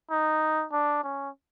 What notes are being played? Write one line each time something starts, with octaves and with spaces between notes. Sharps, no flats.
D#4
D4
C#4